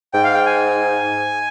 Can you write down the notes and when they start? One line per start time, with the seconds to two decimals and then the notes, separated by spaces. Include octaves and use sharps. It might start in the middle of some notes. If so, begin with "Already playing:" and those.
0.14 G#2 G5
0.24 F5
0.34 G5
0.46 G#5